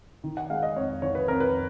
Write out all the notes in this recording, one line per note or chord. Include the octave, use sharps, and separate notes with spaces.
D#3
F#5
G#3 F5
D#5
F2 C#5
D#3 C#5
B4
F2 A#4
B4